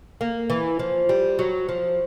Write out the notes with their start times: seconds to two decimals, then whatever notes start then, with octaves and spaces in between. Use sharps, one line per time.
0.21 A#3
0.50 E3
0.79 F3
1.09 G3
1.39 F#3
1.69 F3